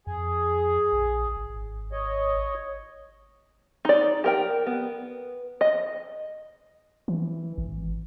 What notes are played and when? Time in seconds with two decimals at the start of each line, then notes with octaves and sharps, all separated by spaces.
0.07 F2 G#4
0.93 A#1
1.37 G#1
1.92 C#5 D#5
3.85 D#4 D5
4.24 G4 A#4 G5
4.66 B3
5.61 D#5
7.08 E3
7.58 G#1